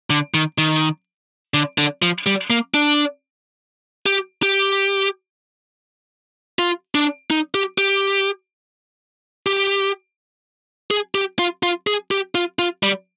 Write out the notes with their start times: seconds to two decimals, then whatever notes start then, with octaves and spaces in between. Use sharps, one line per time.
0.10 D3
0.34 D#3
0.58 D#3
1.54 D3
1.78 D3
2.02 F3
2.26 G3
2.50 A#3
2.74 D4
4.06 G4
4.43 G4
6.59 F4
6.95 D4
7.30 D#4
7.54 G4
7.78 G4
9.46 G4
10.91 G#4
11.15 G4
11.39 F4
11.63 F4
11.87 G#4
12.11 G4
12.35 F4
12.59 F4
12.83 G3